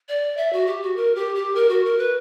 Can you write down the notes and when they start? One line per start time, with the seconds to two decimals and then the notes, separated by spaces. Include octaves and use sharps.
0.08 D5
0.37 E5
0.52 F#4
0.66 G4
0.82 F#4
0.96 A#4
1.15 G4
1.35 G4
1.55 A#4
1.69 F#4
1.84 A#4
1.98 B4